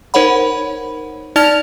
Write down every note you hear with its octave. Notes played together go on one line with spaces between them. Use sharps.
D#4 A#4 C5 C#5 F#5 B5
D#4 D5 A5 F6 A6 F7